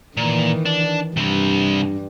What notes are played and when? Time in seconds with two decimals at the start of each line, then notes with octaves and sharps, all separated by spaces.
0.17 A#2 D#3 E3
0.66 D4
1.17 G2 C3 G3